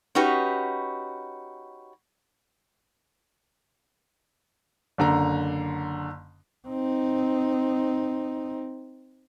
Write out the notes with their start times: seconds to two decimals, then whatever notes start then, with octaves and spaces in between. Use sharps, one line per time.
0.15 C#4 D#4 F#4 G4 B4
4.98 F#1 D3 A#5
6.68 C4 D#4